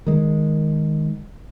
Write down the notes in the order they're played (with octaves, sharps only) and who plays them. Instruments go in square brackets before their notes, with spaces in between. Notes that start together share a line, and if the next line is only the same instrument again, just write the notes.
[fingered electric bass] D#3 G#3